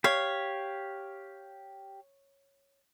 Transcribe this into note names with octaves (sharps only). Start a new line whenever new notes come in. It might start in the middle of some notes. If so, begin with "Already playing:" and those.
G4 C#5 F5